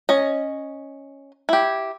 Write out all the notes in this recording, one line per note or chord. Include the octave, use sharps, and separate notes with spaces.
C#4 D#5
E4 G4